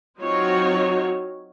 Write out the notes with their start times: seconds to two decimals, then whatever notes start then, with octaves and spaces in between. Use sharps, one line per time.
0.19 F#3 C4 D#4 F4 F#4 C#5